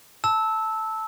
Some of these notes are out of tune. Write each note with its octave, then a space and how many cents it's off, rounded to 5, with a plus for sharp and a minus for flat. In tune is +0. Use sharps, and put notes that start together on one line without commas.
A5 +0 E6 -15